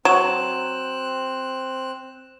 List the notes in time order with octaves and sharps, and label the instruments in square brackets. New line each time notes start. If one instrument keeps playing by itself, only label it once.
[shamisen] F#3 [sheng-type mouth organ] C4 F#6 [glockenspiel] E7